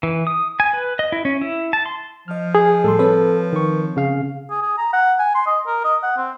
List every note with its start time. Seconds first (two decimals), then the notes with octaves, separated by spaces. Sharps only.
0.03 E3
0.27 D#6
0.60 G#5
0.73 B4
0.99 D#5
1.12 E4
1.25 C#4
1.41 E4
1.73 A5
1.86 C6
2.28 F3 D#5 F6
2.55 G#4
2.84 A2 G3 A4 C6
2.99 C4 A4 B4 C#5
3.53 D#3 C#6
3.97 C#3 F5 F6
4.50 G#4
4.62 G#4
4.78 A#5
4.93 F#5
5.19 G#5
5.35 C6
5.46 D#5
5.67 A#4
5.84 D#5
6.03 F#5
6.17 C4